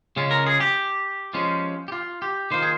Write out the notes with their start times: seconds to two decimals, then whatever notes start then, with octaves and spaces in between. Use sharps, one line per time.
0.16 C#3 G#3 C#4 F4
0.31 A#4
0.47 G#4
0.60 G4
1.33 F3 G#3 C#4 F4
1.88 G4
1.92 F4
2.22 G4
2.51 D#3 A#3 F4 C5
2.63 G#4